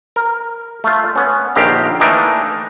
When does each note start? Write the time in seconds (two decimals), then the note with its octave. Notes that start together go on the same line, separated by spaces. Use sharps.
0.16 A#4
0.84 A3 F4
1.16 B3 C#4
1.55 A#1 D3 D#3 G4 F5 A#5
2.00 E3 A3 A#3 D4 D#4